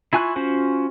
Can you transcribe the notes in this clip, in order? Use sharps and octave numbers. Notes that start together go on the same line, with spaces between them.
E4 F4 G#5 C#6 F#6
C#4 F4 F#4 C5